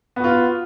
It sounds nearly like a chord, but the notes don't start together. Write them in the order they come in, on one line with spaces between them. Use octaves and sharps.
B3 F#4 F4